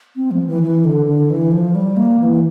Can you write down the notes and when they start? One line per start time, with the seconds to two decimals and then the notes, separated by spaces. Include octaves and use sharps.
0.16 C4
0.31 F3
0.47 E3
0.62 E3
0.85 D3
1.07 D3
1.30 E3
1.51 F3
1.75 G3
1.97 A#3
2.20 E3